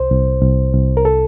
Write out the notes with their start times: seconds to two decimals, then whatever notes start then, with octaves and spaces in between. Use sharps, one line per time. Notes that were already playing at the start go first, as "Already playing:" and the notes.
Already playing: C2 C5
0.11 C2
0.42 C2
0.73 C2
0.97 A#4
1.05 A4